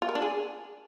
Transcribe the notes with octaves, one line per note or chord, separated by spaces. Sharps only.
F4
A#4
D4
G#4